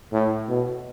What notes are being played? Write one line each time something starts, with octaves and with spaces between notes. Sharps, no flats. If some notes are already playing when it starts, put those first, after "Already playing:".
A2
B2